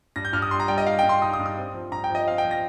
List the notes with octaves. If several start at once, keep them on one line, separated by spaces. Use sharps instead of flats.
G2 A#6
G6
G2 F6
D#6
G3 C6
A#5
G3 G5
D#5
G3 F5
G2 G5
C6
D#4 D#6
D#6
G2
D#6
C4
F3
G2 A#5
G5
F3 D#5
C4 F5
G5
F3
A#6